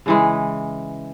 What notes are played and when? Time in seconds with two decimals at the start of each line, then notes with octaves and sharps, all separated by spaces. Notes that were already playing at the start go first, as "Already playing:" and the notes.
0.06 C#3 E3 G#3